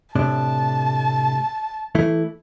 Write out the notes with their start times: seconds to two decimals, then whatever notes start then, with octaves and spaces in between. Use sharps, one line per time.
0.15 A2 C3 D4 A5
1.95 E3 A3 E4